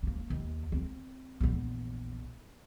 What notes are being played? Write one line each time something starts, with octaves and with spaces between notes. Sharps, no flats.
A#3 C#4
D#2
C4
A#1 E2